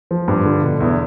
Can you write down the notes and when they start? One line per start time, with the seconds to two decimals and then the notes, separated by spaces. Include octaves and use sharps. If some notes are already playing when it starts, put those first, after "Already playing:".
0.11 F3
0.28 G2
0.45 D3
0.63 B2
0.80 E2